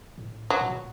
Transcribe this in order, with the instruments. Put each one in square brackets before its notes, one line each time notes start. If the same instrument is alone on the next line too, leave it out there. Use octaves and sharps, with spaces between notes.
[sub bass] A2
[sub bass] A#2 [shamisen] F#3
[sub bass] A2
A#2